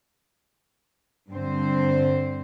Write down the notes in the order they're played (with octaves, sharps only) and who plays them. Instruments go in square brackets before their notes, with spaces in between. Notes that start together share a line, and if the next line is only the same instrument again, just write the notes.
[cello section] G2 D3 C4 C5